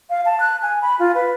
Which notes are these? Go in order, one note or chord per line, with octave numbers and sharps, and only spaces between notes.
F5
A5
F#6
G#5
B5
F4
B4